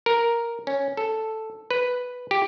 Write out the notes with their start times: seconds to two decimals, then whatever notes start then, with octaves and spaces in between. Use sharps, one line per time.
0.06 A#4
0.67 C#4
0.97 A4
1.71 B4
2.31 G4